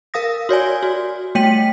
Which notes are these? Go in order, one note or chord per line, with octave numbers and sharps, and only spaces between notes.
A#4 F5 D#6 A#6
F#4 C#5 D5 G#5
F#4
G3 A3 G5 B6 D#7 F#7